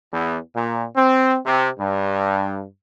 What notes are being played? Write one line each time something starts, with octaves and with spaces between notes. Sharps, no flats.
E2
A#2
C4
C3
G2